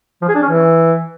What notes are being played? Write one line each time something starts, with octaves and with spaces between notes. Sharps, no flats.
F3
G#4
D4
C#4
E3